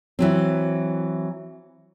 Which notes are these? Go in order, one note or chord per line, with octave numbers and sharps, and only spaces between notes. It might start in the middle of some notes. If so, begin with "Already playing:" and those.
E3 F#3 C4